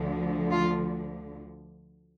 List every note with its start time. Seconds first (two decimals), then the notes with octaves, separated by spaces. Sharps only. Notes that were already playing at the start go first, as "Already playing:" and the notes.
Already playing: D2 D3 F3
0.51 F4